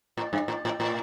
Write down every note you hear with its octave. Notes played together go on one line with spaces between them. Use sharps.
A2
G2
A2
A2
A2